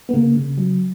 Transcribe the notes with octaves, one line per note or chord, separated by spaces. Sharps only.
B3
C#3 A#3
C#3
F#3